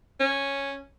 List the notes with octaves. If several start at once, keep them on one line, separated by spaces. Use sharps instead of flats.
C#4